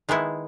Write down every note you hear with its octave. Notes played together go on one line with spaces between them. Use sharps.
D#3 G#3 B3 E4